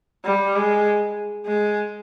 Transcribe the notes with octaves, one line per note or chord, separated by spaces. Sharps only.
G3
G#3
G#3